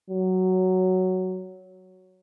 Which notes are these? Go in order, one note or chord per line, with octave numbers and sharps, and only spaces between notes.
F#3